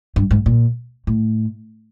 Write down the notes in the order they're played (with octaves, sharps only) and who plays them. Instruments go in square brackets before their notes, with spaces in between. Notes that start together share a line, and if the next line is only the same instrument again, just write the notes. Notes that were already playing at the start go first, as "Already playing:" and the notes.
[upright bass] G2
G#2
A#2
A2